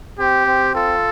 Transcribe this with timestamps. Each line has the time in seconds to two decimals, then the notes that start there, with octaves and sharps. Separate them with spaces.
0.19 C4 G4
0.47 C4
0.75 F4 A4